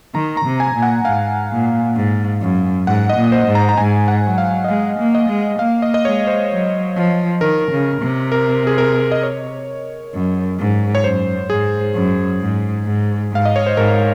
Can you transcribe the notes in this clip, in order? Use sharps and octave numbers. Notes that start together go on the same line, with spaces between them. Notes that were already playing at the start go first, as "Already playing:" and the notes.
D#3 A#5
A#5
C3
G#5
A#2
F#5
G#2 F5
A#2
G#2
F#2
G#2 F#5
D#5
A#2
C5
G#2
A#5
A#5
G#2 G#5
F#5
F#3
F5
D#5
G#3 F5
A#3
D#5
G#3
A#3 F5
D#5
D#5
G#3 C#5
C5
F#3
F3
D#3 A#4
C#3
C3
A#4
G#4
A#4
D#5
C#5
F#2
G#2
C#5
F#2 C5
G#2 G#4
F#2
G#2
G#2
G#2 F5
D#5
C#5
C5
G#2 A#4